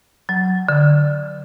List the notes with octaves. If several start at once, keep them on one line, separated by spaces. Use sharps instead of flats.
F#3
D3